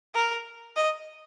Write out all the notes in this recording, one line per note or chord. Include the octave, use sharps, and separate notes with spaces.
A#4
D#5